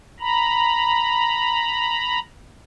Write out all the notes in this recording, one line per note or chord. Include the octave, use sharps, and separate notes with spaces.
A#5 B5